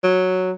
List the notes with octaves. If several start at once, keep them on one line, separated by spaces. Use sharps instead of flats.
F#3